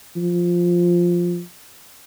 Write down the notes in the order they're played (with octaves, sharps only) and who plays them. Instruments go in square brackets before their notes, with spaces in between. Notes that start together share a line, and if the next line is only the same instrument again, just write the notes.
[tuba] F3